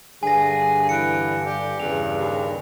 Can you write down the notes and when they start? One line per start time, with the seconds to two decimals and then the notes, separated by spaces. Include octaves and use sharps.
0.23 G2 D3 G#4 G#5 A#6
0.89 E3 C#7 D7
1.46 G4
1.80 E2 G2 C#3 F7
2.18 D#2